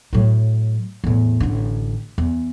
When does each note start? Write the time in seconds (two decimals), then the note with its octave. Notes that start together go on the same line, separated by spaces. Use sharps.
0.13 A2 F#3
1.04 E2 A2
1.40 A1 D3
2.18 E2